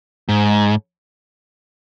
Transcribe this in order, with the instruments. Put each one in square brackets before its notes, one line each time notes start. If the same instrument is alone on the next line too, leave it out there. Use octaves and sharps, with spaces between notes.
[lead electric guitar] G#2